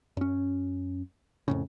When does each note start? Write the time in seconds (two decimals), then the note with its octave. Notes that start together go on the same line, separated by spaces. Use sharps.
0.17 F#2 C#4
1.48 F2 A2 C#3